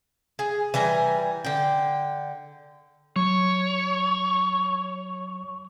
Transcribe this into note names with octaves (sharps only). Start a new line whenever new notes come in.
G#4
E3 G3 G#5 A#5
D3 G5
F#3 C#5